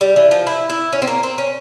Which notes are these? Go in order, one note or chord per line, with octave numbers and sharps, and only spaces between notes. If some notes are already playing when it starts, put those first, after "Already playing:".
G3
E3
F3
E4
E4
C#4
C4
A#3
C4
C#4